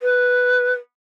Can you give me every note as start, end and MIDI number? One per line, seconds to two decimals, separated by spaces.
0.02 0.73 71